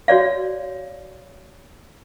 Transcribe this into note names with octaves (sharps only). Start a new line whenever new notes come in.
F#4 C#5 D5 F5